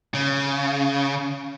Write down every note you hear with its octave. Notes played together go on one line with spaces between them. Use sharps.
C#3